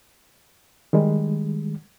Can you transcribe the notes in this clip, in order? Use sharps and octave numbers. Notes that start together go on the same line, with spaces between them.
D#3 G3 G#3